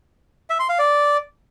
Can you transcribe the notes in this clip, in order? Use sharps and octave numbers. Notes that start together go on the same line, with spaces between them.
E5
C6
F5
D5